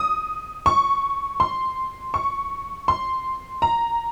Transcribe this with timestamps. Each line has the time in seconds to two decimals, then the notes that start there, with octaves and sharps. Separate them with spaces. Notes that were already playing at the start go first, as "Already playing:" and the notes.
Already playing: D#6
0.66 C#6
1.40 C6
2.14 C#6
2.88 C6
3.62 A#5